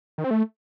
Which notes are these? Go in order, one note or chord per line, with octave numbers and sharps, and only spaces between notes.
D#3
C4
A3